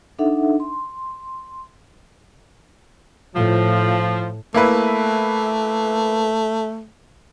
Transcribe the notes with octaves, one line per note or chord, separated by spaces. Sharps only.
D4 D#4 A4 E5 F#5
C6
A2 F3
A3 A#3 E4 B4